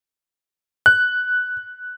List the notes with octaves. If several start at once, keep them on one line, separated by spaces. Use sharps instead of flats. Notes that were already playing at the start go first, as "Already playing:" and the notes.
F#6